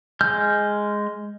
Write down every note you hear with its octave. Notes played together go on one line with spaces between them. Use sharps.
G#3 F6 G6